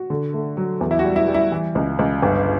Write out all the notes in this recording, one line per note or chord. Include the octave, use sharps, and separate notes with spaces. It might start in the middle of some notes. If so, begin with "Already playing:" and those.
Already playing: F#4
D3
A3
F#3
E2
E4
G3 F#4
E4
G3
E4
E3
C#2
C#2
G1